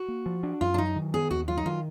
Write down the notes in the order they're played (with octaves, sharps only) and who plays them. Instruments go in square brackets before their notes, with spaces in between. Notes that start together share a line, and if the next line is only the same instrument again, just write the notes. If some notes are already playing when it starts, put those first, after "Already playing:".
Already playing: [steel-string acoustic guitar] F#4
[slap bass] A#3
F3
D4
[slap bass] F#2 [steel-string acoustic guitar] F4
[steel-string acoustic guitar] D4
[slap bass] F#3 [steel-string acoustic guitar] D#4
[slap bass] D#3
[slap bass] B3 [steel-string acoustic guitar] G#4
[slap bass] D#2 [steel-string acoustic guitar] F#4
[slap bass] F#3 [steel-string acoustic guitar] F4
[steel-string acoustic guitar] D#4
[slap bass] D#3 [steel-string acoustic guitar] F4